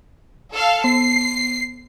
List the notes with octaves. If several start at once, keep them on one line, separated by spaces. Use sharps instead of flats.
A4 F5
B3 C7